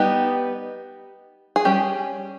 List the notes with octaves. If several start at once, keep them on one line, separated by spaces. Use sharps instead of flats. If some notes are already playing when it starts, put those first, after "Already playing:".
Already playing: G3 B3 D#4 G4
G#4
G3 C#4 G4